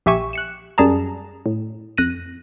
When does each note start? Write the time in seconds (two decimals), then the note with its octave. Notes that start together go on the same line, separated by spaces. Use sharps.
0.06 A#1 G4 E5 G#5 C#6 E7
0.33 F#6 C#7 E7
0.78 F#2 G3 G#4 A5 A#5
1.46 A2
1.98 F2 F#6 A#6 D#7